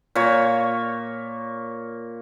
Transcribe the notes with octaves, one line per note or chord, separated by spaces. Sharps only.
A#2 C#5